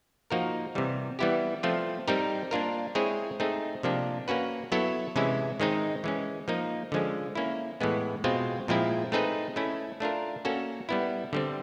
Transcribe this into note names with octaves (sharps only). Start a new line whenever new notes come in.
F3 A#3 D#4 F#4 A#4
C3 E3 G3
E3 G3 B3 E4 G4
F3 A3 C4 F4
G3 C4 D#4 G4 A#4
A#3 D4 F4 A#4
G#3 C4 E4 G#4 C#5
A3 C4 D#4 G#4
C3 F3 A#3 D4 G4
A#3 C#4 F#4 B4
F#3 B3 E4 A4 C#5
C3 E3 G#3 C#4 E4
D#3 G#3 C4 D#4
E3 G#3 C#4
F3 A#3 D#4
D3 F3 G#3 C#4
A#3 C#4 E4
A2 E3 G#3 B3
B2 G#3 C4 F4
A#2 F3 G#3 C4 E4
A3 C4 D#4 G#4 B4
A3 C#4 E4
A3 D4 F4 A#4
A#3 C#4 F#4 A4
G3 B3 E4
D3 G3 C4